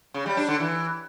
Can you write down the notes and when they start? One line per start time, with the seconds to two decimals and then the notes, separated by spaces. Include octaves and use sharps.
0.14 C#3
0.26 G3
0.37 D4
0.49 D3
0.60 E3